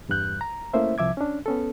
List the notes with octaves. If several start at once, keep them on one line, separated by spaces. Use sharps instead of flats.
E2 G2 G3 F#6 G6
A#5
A3 A#3 C#4 E4 C5 E5
C2 F3 E5 D6 G#6
C#4 D4
B3 C#4 A4